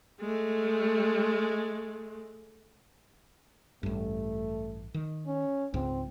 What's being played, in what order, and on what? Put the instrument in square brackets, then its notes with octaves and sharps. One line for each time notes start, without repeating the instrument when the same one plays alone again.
[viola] G#3 A3
[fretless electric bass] A1 G2 [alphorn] A3
[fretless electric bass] D#3
[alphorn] C#4
[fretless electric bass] C#2 G#2 [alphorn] C4